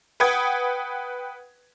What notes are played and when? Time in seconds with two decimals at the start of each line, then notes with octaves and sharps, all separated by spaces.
0.20 B4 F#5 G5 D#6 G#6